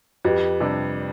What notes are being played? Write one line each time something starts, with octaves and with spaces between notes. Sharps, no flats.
F2 G4 B4
C3 G3 D4